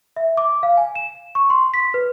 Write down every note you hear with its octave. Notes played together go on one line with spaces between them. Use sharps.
E5
D6
F5
G#5
E7
C#6
C6
B6
B4